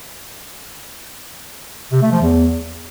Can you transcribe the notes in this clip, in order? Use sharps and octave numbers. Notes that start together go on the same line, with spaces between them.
C3
A3
F3
E2